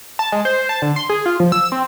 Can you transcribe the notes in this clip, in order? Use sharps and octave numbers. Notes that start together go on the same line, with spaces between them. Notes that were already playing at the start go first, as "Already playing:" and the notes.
A5
G#3
C5
A5
D3
C6
G#4
F4
F3
E6
C4